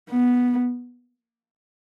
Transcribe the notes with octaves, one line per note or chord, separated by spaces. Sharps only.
B3